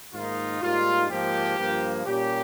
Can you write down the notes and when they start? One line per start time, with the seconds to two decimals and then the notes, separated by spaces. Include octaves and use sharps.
0.14 G#2 D#3 A#3 D#4 F4
0.62 G#2 G3 A#3 D#4 F4
1.09 G#2 F3 A#3 G4
1.57 G2 F3 A#3
2.05 A#2 G3 A#3 C#4 G4